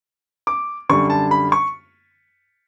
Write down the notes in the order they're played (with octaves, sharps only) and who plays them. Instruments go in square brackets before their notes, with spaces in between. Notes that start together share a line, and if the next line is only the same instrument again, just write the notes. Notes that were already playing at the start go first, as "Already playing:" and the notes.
[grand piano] D6
F#2 D3 G3 C#6
A5
B5
C#6